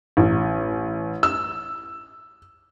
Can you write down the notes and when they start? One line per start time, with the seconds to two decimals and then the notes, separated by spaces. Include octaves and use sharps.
0.17 A1
1.23 E6